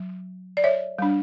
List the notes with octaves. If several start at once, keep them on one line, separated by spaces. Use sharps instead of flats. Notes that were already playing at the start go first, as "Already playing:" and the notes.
Already playing: F#3
D5
C#5 E5
G3 D4